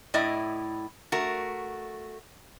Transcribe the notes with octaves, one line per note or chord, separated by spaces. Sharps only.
A2 E4 D5 D#5
A3 F#4 A#4